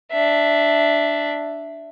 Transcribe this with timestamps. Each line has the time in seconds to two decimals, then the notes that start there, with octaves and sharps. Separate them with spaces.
0.12 D4 E5